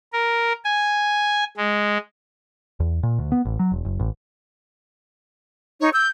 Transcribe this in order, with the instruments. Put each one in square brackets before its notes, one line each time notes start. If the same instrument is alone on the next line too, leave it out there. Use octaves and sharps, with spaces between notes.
[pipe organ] A#4
G#5
G#3
[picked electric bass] E2
A#2
D2
B3
A1
F#3
E1
F#1
A1
[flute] D#4 [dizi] C#5
[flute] E6 [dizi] G6